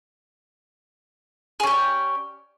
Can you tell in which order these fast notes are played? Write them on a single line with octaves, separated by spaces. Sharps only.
G#4 C#4 G4 D5